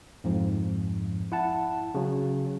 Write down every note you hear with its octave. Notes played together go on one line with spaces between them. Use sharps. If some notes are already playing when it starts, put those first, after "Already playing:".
F2 G#2 F3
E4 F#5 A5
C#3 F#3